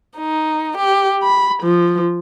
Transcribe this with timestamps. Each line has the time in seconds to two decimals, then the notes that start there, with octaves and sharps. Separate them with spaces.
0.17 D#4
0.77 G4
1.23 B5
1.62 F3